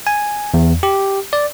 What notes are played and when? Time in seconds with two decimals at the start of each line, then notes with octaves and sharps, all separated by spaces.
0.07 G#5
0.54 E2
0.83 G4
1.33 D5